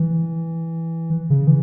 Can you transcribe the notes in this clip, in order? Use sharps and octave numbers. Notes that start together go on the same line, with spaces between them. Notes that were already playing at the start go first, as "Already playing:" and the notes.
Already playing: E3
C#3
E3